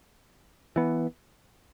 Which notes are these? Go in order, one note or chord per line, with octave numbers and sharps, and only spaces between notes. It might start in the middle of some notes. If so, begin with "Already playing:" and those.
E3 B3